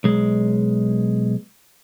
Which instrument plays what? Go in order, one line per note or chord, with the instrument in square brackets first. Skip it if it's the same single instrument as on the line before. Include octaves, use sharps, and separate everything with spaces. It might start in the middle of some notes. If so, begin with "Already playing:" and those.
[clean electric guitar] B1 G#3